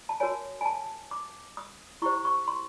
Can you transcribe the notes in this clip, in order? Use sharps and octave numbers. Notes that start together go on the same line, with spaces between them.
A5
F#4 A#4 C#5 G#5
G#5
A5
D6
D#6
E4 G4 C5 C#6
C#6
C6